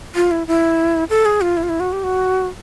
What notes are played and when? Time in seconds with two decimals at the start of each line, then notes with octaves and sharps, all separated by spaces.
0.15 F4
0.31 E4
0.47 E4
1.10 A4
1.25 G#4
1.41 F4
1.57 E4
1.63 F4
1.69 E4
1.80 F#4
1.93 G4
2.04 F#4